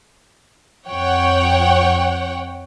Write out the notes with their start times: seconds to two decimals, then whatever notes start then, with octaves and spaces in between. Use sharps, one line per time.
0.88 F2 C#5 F#5 G5